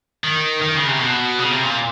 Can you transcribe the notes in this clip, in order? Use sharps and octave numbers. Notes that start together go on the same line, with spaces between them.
D#3
D#3
C#3
C3
B2
C#3
C3
A#2